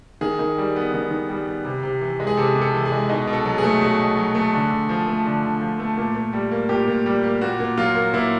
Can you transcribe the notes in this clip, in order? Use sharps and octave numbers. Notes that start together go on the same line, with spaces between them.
D#3 G#4
D#3
G3
B3
D#3
D#3
G3
B3
C3
C3
E3
G#3
G#4
C3 A4
C3
A4
E3
G#4
G#3
B2 D#4
B2
A4
F#3
G#4
A3
B2 G#4
B2
F#3
A3
D3
D3
F3
A3
D3
D3
F3
A3
A#2
A#2
G3
A#3
A#2 G4
A#2
G3
A#3
A#2 F#4
A#2
F#3 F4
A#3
A#2 E4